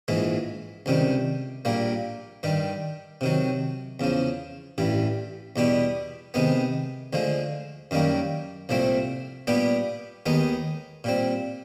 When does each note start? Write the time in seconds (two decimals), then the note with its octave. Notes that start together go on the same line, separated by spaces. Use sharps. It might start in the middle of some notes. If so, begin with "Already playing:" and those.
0.08 A#1 G#2 E3 G#3
0.86 C#2 C3 D#3 G3
1.65 A#1 A#2 G3 A#3
2.43 G2 D#3 G3
3.21 C3 D#3 F#3
4.00 E2 C#3 F3
4.78 A1 G2 E3 G3
5.56 E2 B2 G3 B3 D4
6.34 C3 D#3 G#3 B3
7.13 D2 D3 F3 G#3
7.91 F#2 D#3 G3 A#3
8.69 C2 A#2 F3 A3 C4
9.47 A#2 G3 B3 D4 G4
10.26 D#2 D#3 G#3 B3 D#4
11.04 A#2 G3 C4